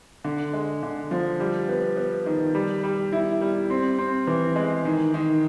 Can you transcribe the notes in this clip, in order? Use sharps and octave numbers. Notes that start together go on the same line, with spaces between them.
D3
G#3
D3
F3
G3
B3
B3
D#3
G3
G3
E4
G3
C4
C4
E3
G#3
D#3
D#3